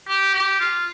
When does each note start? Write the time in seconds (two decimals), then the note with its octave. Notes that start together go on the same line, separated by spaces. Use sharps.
0.08 G4
0.33 G4
0.60 F4